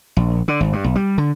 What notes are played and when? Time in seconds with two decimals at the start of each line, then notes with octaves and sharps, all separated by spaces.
0.17 A#1
0.48 D3
0.60 G#1
0.73 G2
0.84 B1
0.95 G3
1.18 D3